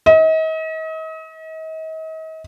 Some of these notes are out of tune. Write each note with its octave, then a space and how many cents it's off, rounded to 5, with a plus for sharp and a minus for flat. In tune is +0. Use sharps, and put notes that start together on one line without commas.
D#5 +40